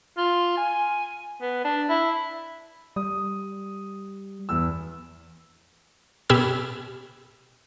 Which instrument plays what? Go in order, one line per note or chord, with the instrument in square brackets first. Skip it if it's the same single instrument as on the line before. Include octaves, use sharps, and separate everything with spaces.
[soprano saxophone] F4
G#5
B3
D4
E4
[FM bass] G3 [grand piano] D#6
[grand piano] E2 E6
[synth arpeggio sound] B2 G4 B5 E6 G#6